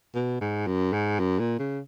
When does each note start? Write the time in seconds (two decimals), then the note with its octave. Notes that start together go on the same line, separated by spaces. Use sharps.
0.15 B2
0.41 G#2
0.67 F#2
0.93 G#2
1.19 F#2
1.39 A#2
1.59 C#3